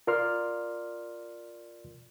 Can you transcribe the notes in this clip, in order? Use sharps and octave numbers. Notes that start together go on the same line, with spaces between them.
F4 A#4 D5 C6 F6